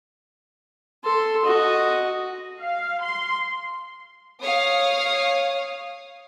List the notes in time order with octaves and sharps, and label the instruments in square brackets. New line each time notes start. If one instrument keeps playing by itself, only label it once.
[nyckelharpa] A4 C6
F#4 D#5
[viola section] F5
C6
[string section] C#5 F5 D#6